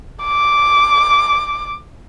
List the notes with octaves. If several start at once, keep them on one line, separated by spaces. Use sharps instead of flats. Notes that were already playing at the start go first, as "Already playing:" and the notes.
D6